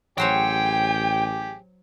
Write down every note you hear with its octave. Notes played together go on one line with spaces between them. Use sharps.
A1 F#3 G4 G#4 C5 C#5 G5